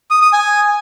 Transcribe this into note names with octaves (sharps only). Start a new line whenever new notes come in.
D#6
D#6
G#5